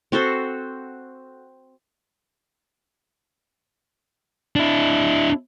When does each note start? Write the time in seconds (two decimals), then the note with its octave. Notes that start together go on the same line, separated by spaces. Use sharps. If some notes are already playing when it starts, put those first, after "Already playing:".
0.12 C4 F#4 A4 C5
4.56 D4 E4